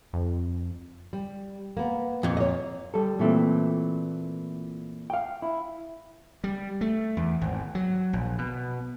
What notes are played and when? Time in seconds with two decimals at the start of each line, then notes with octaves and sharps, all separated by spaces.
0.13 F2
1.13 G3
1.77 A#3 B3
2.23 F2 A#2
2.37 C#5 D#5
2.94 G3 A4
3.19 A#2 E3 A3 C4
5.10 F5 G5
5.42 E4
6.44 G3
6.81 A3
7.17 E2
7.41 G#1
7.75 F#3
8.13 A#1
8.38 B2